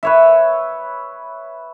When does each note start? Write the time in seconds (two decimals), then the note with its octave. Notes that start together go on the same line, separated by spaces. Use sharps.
0.03 B4 C#5 E5